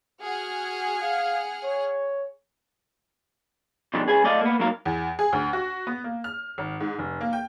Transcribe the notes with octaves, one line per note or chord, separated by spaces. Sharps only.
F#4 G#4 F#5 F6
F5
C#5
B2 D#3 F3 A3 D4 G4
C#2 G#4 B4 G#5
A3 A4 D5 D#5 F5
A#3 B3
G#2 F#3 A#3 A#4 F5
E2
G#4
D2
F#4
B3
A#3
F6
G#1
G#2
F1
A#3
G5